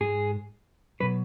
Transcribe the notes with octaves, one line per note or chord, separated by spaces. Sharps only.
G#2 G#3 G#4
B2 F#3 B4